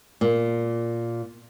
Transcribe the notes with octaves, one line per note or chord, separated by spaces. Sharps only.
A#2